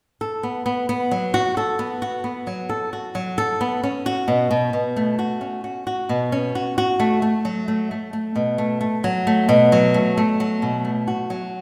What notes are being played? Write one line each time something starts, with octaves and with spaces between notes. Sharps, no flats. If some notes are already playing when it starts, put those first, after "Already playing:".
A4
B3
B3
B3
F#3
F#4
A4
B3
F#4
B3
F#3
A4
F#4
F#3
A4
B3
C#4
F#4
B2
B2
B2
A3
F#4
C#4
F#4
F#4
B2
C#4
F#4
F#4
A3
A3
F#3
A3
A3
A3
B2
A3
A3
F#3
A3
B2
F#3
A3
A3
F#3
B2
A3
F#4
F#3